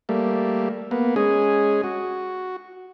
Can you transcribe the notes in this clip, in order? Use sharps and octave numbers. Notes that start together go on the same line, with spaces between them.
G3 A3 A#3
A#3 B3
G#3 C#4 G#4
F#4